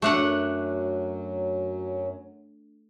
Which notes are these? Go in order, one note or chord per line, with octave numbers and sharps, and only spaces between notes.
F#2 F#3 A3 D4 F#5